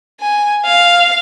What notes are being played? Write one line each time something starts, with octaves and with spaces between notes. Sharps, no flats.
G#5
F5